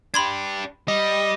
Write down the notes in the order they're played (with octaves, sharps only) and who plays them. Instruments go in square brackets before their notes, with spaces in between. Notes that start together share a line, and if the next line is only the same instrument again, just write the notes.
[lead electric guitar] D4 G4 [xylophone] B5 C6 G#6
[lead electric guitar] G3 [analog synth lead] D#5